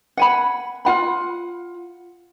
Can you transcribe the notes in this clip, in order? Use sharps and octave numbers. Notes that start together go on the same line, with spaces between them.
F#5 G#5 B5
F4 F#5 B5